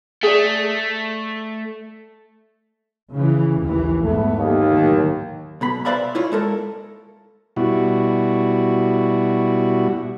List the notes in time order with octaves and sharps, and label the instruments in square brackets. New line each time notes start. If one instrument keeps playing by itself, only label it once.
[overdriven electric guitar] A3 [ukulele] G#4 D5
[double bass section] C#3 E3
A#1 D#2 E3
[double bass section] E2 G#2 B3 [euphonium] A3
[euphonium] D#2
[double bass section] A2 D#3 F#3
[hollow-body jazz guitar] B1 B2 B5
B4 C5 D5 E5 F5 B5
E4 F4 C#5
G#3 A4 A#4
[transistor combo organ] B2 G3 E4 F#4